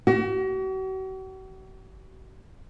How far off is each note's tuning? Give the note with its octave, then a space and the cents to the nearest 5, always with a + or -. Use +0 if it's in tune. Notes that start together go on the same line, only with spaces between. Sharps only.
F#4 +45